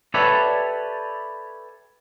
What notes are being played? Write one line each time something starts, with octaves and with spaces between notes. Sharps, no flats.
G4 A4 B4 C#5 D5 E5